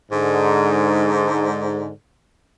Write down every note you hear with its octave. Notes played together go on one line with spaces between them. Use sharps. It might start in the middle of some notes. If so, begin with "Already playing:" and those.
G#2 D3